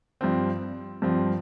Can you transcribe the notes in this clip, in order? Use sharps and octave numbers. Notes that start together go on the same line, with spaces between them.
G2 F3 C4
G2 F3 C4